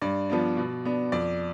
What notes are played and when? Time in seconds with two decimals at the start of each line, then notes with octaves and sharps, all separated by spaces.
0.02 G2 D5
0.30 F3 B3 D4
0.57 B2
0.85 B3 D4
1.12 F2 D5